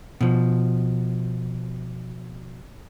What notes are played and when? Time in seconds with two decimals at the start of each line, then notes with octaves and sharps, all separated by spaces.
0.21 B2 F3